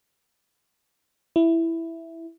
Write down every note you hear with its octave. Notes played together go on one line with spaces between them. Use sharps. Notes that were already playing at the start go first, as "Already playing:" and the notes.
E4